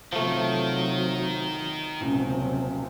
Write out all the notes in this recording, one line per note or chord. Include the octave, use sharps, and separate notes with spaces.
C3 D#3 F3 F#3 A3
D#1 C#2 C3 F#3